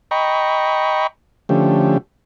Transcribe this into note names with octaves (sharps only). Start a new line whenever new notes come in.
D#5 G5 A#5 B5 C#6
D3 F3 A3 C#4 G4